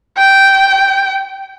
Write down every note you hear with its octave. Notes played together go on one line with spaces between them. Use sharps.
G5